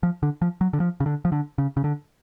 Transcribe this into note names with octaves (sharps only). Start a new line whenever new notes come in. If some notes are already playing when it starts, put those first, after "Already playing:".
F3
D3
F3
F#3
D3
F3
C#3
D3
F3
D3
C#3
C#3
D3